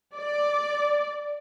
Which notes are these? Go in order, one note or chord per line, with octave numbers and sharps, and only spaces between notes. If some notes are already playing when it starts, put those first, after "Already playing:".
D5